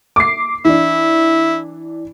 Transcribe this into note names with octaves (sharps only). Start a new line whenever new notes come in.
D6 C7
E3 D4 E4